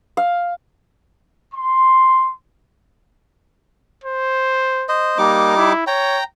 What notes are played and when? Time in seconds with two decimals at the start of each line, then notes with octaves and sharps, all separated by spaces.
0.17 F5
1.54 C6
4.04 C5
4.89 C5 D#5
5.18 G3 A#3 D#4 D6
5.57 E4
5.87 C#5 G5 A#5